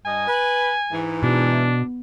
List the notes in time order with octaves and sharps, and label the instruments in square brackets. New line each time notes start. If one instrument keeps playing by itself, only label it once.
[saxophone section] G2 D#5 [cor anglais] G#5
[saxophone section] B4
G#2 E3
[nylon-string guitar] B2 [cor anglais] D4